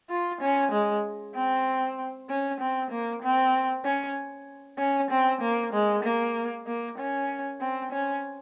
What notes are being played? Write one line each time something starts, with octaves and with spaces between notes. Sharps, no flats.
F4
C#4
G#3
C4
C#4
C4
A#3
C4
C#4
C#4
C4
A#3
G#3
A#3
A#3
C#4
C4
C#4